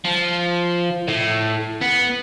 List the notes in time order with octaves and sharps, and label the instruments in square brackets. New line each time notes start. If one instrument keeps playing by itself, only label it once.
[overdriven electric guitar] F3
A2
B3